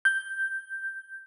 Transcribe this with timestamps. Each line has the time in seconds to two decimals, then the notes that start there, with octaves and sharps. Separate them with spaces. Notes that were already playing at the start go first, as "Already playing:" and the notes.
0.05 G6